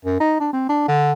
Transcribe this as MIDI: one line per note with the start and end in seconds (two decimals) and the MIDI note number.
0.05 0.18 42
0.20 0.36 63
0.40 0.49 62
0.53 0.65 60
0.69 0.84 62
0.88 1.12 50